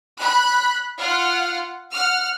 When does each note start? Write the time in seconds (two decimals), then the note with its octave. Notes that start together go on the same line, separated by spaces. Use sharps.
0.20 B5 F#6
0.98 F4 F#5 F6
1.92 F#5 F6